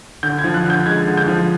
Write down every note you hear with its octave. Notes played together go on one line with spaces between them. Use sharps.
D3 G6
G#6
F3
F#6
D3
G6
G#3 G#6
D3
G6
F3